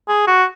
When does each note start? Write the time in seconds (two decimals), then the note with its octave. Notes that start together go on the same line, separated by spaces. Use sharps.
0.09 G#4
0.27 F#4